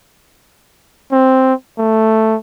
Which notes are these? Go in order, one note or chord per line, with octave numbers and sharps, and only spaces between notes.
C4
A3